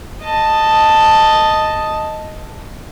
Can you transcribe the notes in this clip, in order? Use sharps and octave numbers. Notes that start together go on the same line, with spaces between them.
D#5 A5